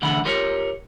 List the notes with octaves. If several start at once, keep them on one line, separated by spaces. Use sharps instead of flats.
D2 B2 D3 E3 F#5 B5
F4 G4 A#4 C#5